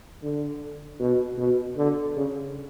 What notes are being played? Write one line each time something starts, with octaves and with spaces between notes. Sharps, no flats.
D3
B2
B2
D3
C#3